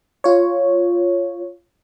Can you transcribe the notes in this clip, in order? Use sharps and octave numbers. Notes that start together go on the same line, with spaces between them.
F4 C#5